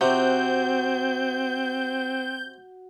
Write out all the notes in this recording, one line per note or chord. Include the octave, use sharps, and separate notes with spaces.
C3 C4 F#4 G6